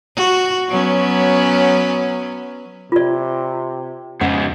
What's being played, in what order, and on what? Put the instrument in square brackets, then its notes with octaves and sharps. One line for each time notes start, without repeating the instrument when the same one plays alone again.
[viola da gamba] F#4
F#3 B3 C#4
[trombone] C3 [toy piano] F4 D5
[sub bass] F2 [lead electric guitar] G#2 C#3 [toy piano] F#5